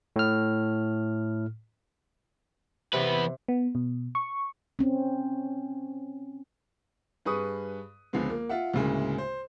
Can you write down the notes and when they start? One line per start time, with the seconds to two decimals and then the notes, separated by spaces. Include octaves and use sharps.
0.16 A2 F6
2.94 E2 C3 B4
3.48 B3
3.75 B2
4.15 C#6
4.79 C4 C#4
7.26 G2 G#4 B4 C#6 D#6
8.13 C#2 D3 F3 G#3 B3
8.30 A#3
8.49 F4 E5 F#5
8.73 D2 A2 C#3 G#3 A#3
9.18 C5